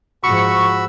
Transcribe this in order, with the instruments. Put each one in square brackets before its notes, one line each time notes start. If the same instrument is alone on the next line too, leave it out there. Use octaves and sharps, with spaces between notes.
[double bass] G#2 F3 [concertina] F#4 B5 E6 [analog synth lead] C#6